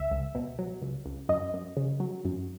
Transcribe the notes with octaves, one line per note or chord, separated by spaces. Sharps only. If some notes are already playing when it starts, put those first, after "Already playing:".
Already playing: C#2 E5
C#2
B2
F#3
C#2
C#2
F#2 D#5
F#2
C#3
F#3
F#2